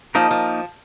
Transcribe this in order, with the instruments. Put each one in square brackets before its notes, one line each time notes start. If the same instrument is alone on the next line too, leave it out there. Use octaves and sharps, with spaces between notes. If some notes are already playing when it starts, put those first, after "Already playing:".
[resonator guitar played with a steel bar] F3 [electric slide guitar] A#3 D#4 A#4 D#5
[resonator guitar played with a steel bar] F3